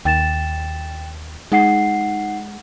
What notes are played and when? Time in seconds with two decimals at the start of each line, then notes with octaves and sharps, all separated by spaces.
0.05 D#2 G5 A6 E7
1.52 G#3 D#4 F#5 C7